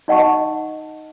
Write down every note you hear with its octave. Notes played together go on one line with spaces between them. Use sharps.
D#4 D#5 F#5 A5 C#6